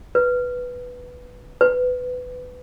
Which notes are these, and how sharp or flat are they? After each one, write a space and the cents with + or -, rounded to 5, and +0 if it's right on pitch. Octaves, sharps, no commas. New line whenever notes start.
B4 +0
B4 +20